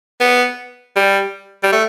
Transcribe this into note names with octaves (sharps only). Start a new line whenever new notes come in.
B3
G3
G3
A3